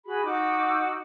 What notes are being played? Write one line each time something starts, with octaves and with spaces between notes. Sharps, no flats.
F#4 G#4 B5
D#4 F#4 D6 E6